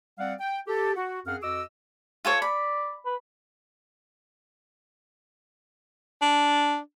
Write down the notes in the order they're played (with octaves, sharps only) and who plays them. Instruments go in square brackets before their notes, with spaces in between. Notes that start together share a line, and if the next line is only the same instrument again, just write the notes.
[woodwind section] G3 C4 D5 F5 F#5
G5
G4 A4
F#4
F#2 C4 G#4 F5 F#5 F6
F2 F#4 D#5 D6 E6
[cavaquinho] F4 A4 C#5
[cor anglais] D5 [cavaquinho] B5
[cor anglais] B4
[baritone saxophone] D4